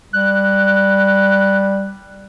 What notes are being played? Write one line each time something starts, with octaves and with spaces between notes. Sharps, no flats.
G3 F#6